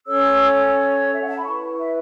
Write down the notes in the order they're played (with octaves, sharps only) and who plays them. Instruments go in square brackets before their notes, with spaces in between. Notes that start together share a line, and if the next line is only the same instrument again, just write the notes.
[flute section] C#4 A4 C#5 E6
E5
F#5
A5
B5
E4 B4 C#6
E5